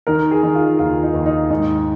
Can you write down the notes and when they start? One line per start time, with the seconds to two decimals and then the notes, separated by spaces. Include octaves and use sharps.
0.07 D#3 A#4
0.31 G#4
0.43 D#3
0.55 F4
0.79 D#2 F4
1.03 D#4
1.14 D#2
1.26 D#4
1.50 G#2 D#4